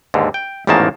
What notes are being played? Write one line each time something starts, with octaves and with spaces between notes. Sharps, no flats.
D#2 G#2 D3
G5
A1 E2 G#2 D#3 A#3 A5